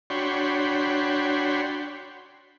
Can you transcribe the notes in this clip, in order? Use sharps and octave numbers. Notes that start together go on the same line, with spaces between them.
D4 F#4 C#5 G5 B5 C6